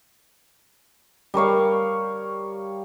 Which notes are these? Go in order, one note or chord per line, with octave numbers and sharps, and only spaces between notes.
G3 A#4 C#5 F5